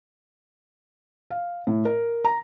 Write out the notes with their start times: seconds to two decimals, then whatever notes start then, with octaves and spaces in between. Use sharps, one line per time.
1.30 F5
1.67 A2
1.85 A#4
2.24 A#5